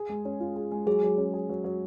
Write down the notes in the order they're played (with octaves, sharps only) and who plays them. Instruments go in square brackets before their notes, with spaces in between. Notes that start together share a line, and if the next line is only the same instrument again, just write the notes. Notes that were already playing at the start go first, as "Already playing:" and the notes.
Already playing: [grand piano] G#4
G#3
C#4
F4
G#4
G#3
[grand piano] F#3 [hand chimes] G#4
[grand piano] F#3
C#4
G#4
F#3
F#3